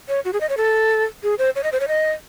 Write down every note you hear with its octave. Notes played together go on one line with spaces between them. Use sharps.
C#5
F#4
G#4
D#5
C#5
A4
G#4
C5
C#5
D#5
C5
C#5
D#5